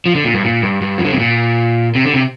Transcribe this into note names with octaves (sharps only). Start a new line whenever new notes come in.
F3
D3
A#2
G2
A#2
G2
G2
F3
D3
C3
A#2
C3
D3
C3